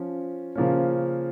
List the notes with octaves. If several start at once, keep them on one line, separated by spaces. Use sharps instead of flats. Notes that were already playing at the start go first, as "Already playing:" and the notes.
Already playing: F3 C#4
C#3 F3 A#3 C#4